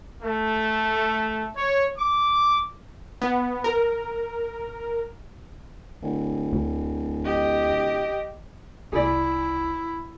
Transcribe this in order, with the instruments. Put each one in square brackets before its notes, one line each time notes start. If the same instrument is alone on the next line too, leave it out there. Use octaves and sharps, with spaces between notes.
[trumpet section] A3
C#5
D6
[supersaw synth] B3
A#4
[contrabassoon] D1
[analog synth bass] D2
[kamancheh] G4 D#5
[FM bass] C2 [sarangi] E4 [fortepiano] G#4 D5